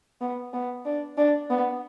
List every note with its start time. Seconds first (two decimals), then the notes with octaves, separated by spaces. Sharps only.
0.21 B3
0.53 B3
0.86 D4
1.17 D4
1.50 B3